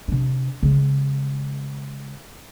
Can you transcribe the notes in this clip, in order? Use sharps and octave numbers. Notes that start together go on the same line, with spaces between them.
C3 D4
C#3 G#3